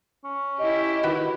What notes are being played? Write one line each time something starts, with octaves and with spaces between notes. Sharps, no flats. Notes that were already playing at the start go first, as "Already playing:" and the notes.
C#4
E4 G4 D#5
D#3 F#4 B4 B5